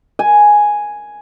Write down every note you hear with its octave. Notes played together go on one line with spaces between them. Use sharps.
G#5